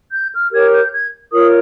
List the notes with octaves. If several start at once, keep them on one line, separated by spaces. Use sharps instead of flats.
G6
F6
G4 A#4 C#5 G#6
G6
G#6
F4 A#4 C#5 D#6